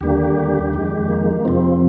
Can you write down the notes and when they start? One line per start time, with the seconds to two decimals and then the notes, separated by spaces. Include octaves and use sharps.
0.01 D#2 D3 G3 A#3 G4
0.73 F2 D#3 G#3
1.09 A#3
1.45 F2 C3 F3 C4